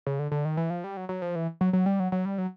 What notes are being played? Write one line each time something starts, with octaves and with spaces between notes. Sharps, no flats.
C#3
D3
D3
D#3
E3
F3
G3
F#3
F#3
F3
E3
F#3
F#3
G3
F#3
F#3
G3
F#3